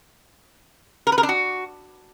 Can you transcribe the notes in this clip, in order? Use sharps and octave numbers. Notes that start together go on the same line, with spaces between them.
A#4
B4
A#4
D4
F#4